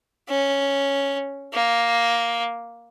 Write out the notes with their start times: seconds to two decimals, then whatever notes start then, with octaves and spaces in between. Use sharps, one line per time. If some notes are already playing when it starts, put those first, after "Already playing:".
0.29 C#4
1.54 A#3